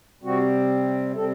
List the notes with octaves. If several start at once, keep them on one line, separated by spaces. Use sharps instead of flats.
C3 G3 C4 F#4
C3 G3 C4 A4